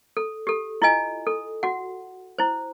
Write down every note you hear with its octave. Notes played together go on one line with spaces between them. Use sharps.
A4
G4 A4
E4 F4 D#5 G#5
A4
F#4 F#5
E4 C5